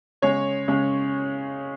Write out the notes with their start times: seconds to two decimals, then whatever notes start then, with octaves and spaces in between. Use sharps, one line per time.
0.22 C#3 G#3 C#5
0.68 C#3 G#3